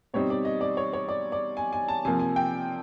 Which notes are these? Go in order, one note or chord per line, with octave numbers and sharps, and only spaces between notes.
B2 G3 C4 D#4 C#5
D5
D#5
D5
C#5
C#5
D5
D5
G#5
G#5
A5
C3 F3 A#3 G#5
G#5
G5